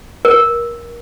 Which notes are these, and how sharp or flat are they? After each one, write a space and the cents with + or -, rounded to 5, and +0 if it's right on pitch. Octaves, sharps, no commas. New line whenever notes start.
A#4 +20